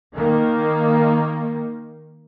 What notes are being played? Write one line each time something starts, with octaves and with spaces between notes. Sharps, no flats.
D#3 A#3